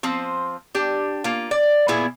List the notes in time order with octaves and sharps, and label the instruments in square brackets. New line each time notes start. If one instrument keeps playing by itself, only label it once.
[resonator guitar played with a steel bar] F3 C4 C5
D4 G4
A#3 F4
D5
A#2 B3 E4 G#4